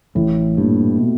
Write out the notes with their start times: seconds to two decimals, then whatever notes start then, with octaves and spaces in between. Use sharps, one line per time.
0.15 A1 A2
0.57 G2 A#2
0.99 B2